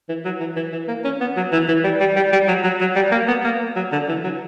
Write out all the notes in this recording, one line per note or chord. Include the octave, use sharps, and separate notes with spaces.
E3
F#3
E3
E3
E3
A#3
C#4
B3
F#3
E3
E3
G3
G3
G3
G3
F#3
F#3
F#3
G3
A#3
B3
A#3
F#3
D3
E3
F#3